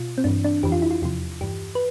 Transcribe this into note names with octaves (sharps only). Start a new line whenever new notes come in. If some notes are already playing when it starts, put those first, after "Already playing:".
Already playing: B2 F4
C4
G2 E3 D4
D4
F2 E3 G4
F4
E4
F4
E2 C3 F3 F4
G2 E3 G4
B4